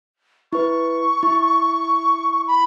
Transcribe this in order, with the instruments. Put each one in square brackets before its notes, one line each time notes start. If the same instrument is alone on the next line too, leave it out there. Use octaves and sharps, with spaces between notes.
[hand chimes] E4 B4 [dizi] C#6
[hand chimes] E4
[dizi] B5